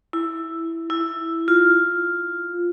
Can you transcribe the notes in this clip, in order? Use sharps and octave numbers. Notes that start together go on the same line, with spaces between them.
E4
E4
F4